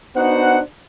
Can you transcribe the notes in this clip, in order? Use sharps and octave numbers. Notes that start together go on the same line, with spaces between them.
B3 D4 D#4 F#4 C5 F#5